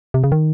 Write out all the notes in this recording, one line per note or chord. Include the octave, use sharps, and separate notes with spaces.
C3
C#3
D#3